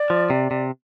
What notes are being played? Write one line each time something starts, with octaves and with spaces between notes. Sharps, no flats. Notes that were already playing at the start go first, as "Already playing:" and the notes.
Already playing: D5
F3
C3
C3